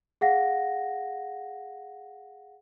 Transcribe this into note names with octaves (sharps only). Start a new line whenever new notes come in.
G#4 F5 F#5 A#6